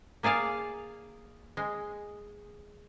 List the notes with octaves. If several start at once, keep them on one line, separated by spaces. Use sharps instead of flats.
A#3 G#4 D5 F5 A5
G#3